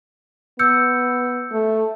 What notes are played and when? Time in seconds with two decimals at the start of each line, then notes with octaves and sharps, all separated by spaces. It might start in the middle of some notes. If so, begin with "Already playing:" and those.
0.59 B3 E6 G6 C#7
1.52 A3